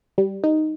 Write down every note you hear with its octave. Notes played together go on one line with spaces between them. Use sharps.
G3
D#4